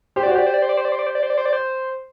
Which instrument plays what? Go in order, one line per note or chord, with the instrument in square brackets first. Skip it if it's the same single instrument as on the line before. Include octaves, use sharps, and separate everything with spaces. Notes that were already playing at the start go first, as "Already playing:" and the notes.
[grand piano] G4 [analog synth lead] C5
[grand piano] F#4 [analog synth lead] D5
[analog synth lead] C5
[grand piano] G4 [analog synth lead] D5
[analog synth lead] C5
D5
C5
D5
C5
D5
C5
D5
C5
D5
C5
D5
C5
D5
C5